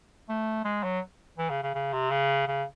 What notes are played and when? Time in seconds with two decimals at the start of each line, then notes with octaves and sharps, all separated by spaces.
0.29 A3
0.64 G#3
0.83 F#3
1.37 E3
1.50 C#3
1.62 C#3
1.75 C#3
1.93 C3
2.10 C#3
2.47 C#3